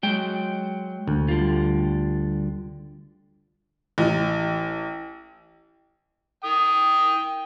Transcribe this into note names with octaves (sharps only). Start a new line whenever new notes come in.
F#3 G#3 G5
D2
D3 G3 F4
A1
G5 D#6